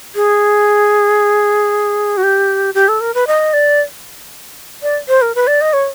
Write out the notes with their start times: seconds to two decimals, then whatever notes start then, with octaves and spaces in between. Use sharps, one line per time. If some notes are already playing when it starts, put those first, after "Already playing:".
0.15 G#4
2.17 F#4
2.23 G4
2.75 G4
2.88 A4
3.01 A#4
3.14 B4
3.27 D#5
3.53 D5
4.83 D5
5.09 C5
5.22 A#4
5.35 B4
5.47 D5
5.61 D#5
5.73 C#5